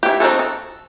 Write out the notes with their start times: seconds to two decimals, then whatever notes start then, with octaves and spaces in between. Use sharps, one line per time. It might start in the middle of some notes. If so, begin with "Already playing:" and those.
0.03 E4 G4
0.20 C4 D#4 E4 F#4 A4
0.39 A4